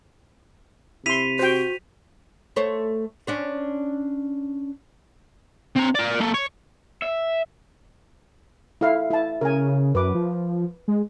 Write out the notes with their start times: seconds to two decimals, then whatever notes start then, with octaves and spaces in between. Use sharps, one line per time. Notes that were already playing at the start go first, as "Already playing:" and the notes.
1.06 C3 E4 C6 B6 D#7 F7
1.39 F#4 C5 G5
2.56 A3 C5 C#5
3.27 C#4 D4 C5
5.76 C4 A#5
5.95 A#4 D5
6.20 A#3 A4
6.34 C#5
7.02 E5
8.81 E4 A4 F5
9.10 E4 A5
9.41 C#3 A#4 G#5
9.95 F#2 B4 D6
10.15 F3
10.88 G#3